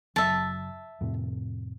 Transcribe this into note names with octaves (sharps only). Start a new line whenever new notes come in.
F#1 F#3 E5 A5
F2 A2 C3